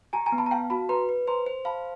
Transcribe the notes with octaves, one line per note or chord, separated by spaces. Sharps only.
G4 G#5 A#5
G#5 A#5
B3
A5 B5
A#5
F5 G5 A5
F#4 A5 B5
B4 A#5 C6
B4
C5 A#5 C6
C5
F5 A5 B5